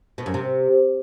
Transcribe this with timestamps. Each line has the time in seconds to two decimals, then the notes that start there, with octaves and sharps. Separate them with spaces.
0.18 B2
0.26 F#2
0.34 C3